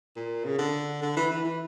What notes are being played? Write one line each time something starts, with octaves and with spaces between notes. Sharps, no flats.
A#2
C#3
D3
D3
E3
E3
E3